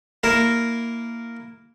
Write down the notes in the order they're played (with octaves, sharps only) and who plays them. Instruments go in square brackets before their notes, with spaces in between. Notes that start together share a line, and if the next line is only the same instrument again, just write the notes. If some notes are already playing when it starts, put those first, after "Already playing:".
[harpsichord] A#3 E4 A#4